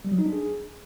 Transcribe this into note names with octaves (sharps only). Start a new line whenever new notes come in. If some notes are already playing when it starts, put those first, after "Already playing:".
G3
F#3
D#4
D4
G#4